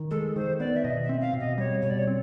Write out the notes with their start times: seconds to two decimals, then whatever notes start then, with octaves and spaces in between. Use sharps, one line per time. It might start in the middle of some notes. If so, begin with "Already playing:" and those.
Already playing: D#3
0.11 G#3 A4
0.36 D#3 C5
0.60 B3 D5
0.76 E5
0.84 B2 D#5
1.04 E5
1.09 C4
1.21 F5
1.34 B2
1.40 D#5
1.58 G3 C#5
1.82 B2 C#5
1.90 D5
1.99 C#5
2.07 C4